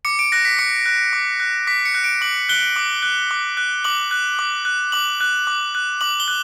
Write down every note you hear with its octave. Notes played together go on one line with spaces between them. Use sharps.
D6 C#7
D7
F#6 A#6
B6
D6 C#7
F#6
D6
F#6
D6 B6
C#7
F#6
D7
D6 F#7
F#6 G7
D6
F#6
D6
F#6
D6 F#7
F#6
D6
F#6
D6 F#7
F#6
D6
F#6
D6 F#7
G7
F#6